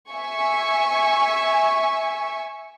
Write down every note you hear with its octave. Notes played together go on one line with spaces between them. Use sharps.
E5 G#5 C#6